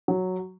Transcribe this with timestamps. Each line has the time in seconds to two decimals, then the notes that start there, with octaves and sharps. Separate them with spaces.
0.08 F#3